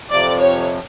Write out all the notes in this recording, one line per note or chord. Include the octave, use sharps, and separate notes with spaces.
F2 C3 F3 D5
C#5